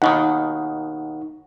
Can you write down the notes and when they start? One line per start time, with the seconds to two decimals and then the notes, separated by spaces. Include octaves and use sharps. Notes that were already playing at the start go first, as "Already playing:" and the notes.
0.02 D#2 B2 D#3 D#4 F#5